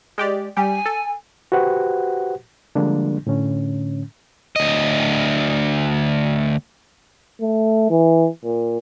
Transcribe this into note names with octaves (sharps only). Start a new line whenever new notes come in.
G#3 G4 D5
G3 G4 G#5
A4
F#4 G4 B4 C5 F#5
D3 F3 G3 G#3 A#3 D4
A2 D3 C#4
D2 D#5
A3
E3
A#2